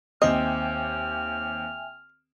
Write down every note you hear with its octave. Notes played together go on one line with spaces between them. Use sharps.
D#2 C4 D#5 E5 G5 G#5 F6